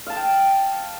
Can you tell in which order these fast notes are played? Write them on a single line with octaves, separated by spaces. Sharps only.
F5 A5 E6 G5